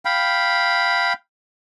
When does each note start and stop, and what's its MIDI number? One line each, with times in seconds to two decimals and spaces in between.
0.05 1.13 77
0.05 1.13 79
0.05 1.13 83